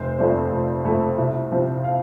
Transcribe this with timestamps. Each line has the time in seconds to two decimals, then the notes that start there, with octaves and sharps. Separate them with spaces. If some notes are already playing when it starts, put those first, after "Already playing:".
Already playing: F1 C5
0.19 F2 F3 A3 C4 D5
0.52 F1
0.84 F2 F3 A3 C4
1.18 C2
1.51 C3 F3 C4
1.84 F5